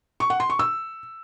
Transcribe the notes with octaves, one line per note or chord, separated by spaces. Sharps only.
C#6
F#5
C6
C#6
E6